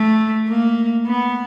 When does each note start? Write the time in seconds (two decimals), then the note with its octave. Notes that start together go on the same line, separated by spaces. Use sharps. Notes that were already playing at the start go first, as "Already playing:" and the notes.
Already playing: A3
0.49 A#3
1.07 B3